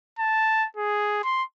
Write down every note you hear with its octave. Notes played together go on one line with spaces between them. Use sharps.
A5
G#4
C6